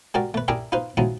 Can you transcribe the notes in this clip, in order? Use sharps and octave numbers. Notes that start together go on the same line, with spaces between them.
G#3 F#4 G4 A#4 D5
A3 B4
D4 E4 G4 G#4 A#4 E5
D#4 F4 B4 C5
F3 F#3 G#3 D#4 E4